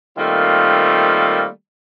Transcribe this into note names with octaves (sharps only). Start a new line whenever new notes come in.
D#3 G3 A3 A#3 C4 F4